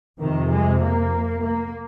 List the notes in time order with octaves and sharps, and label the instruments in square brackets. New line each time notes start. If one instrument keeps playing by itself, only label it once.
[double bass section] F2 C3 D#3
G#3
A#3
A#3